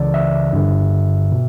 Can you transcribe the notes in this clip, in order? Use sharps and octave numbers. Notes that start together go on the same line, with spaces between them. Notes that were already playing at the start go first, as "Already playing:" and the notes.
Already playing: C#2 C#3 E3 D5
E5
G2 D3
B2